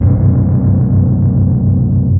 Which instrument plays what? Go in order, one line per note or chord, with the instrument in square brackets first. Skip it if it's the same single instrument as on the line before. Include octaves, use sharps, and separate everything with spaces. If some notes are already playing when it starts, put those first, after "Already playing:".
[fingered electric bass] C2 F#2 B2